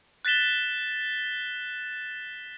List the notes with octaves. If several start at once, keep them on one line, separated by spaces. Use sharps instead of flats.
F#6 A6 B6 E7 G7